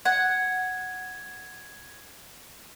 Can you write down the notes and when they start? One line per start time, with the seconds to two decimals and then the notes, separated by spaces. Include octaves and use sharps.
0.05 F#5 G#6